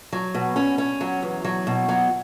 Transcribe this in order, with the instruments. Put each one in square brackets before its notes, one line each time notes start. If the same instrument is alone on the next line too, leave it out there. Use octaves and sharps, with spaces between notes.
[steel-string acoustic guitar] F#3
B2
C#4
C#4
F#3
E2
F#3
B2
F#3